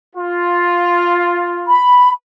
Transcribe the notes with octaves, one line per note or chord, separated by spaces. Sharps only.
F4
B5